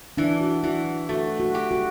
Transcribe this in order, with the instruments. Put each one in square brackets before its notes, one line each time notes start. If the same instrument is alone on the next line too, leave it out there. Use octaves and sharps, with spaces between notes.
[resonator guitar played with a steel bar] E3 [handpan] D4
[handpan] F#4
[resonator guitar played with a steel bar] E3 [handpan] F#4
[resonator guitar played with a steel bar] A3 [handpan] F#4
[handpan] F#4
[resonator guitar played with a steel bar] G4
[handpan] F#4